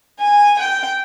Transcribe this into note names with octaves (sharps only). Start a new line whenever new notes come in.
G#5
G5